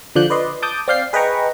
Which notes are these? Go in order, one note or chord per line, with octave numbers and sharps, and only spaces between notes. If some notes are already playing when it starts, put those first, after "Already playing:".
D3 F3 D5 F#6 G6
B4 D5 D#5 C6
A5 D6 D#6 G6
C4 D5 F5 G6 C7
G#4 B4 D#5 G5 A#5 C#6